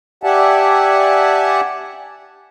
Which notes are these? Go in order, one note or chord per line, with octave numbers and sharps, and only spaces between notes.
G4 D5 E5 F#5 G#5 A5